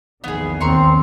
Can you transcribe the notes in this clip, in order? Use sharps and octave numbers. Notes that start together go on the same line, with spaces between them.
A#1 E2 D#3 B3 G#4
D#2 C4 A#5 C6 C#6